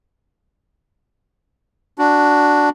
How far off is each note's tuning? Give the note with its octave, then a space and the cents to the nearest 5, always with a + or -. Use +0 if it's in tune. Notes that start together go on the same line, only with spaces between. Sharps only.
D4 +0 F#4 +0